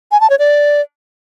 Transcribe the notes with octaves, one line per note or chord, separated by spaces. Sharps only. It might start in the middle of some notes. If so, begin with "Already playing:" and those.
G#5
A5
C#5
D5